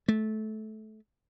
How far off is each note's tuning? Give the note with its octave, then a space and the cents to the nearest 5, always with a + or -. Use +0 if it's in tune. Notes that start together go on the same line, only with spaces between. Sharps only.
A3 -20